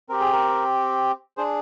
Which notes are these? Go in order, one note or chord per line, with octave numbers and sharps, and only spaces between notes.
C4 G4 A#4
G#4
A#4
D4 G#4 C5